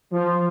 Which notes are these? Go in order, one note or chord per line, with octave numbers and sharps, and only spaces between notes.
F3